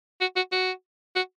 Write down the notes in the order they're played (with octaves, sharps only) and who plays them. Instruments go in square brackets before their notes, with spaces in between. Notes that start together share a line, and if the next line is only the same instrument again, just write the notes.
[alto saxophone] F#4
F#4
F#4
F#4